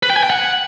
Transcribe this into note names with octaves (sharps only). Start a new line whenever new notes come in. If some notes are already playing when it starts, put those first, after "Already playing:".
B4
G5
G#5
G5
F#5